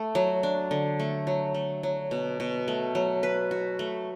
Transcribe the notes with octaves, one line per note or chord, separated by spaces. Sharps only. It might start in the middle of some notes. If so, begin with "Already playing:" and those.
Already playing: A3
F#3
D4
D3
A3
F#3
A3
F#3
B2
B2
A3
F#3
B4
F#4
A3